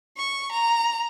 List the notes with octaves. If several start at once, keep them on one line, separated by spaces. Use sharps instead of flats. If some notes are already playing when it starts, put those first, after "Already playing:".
C#6
A#5